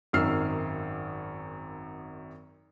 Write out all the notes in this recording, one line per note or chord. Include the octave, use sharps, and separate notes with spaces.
G#1 F#2 D#3 E6 F6 C7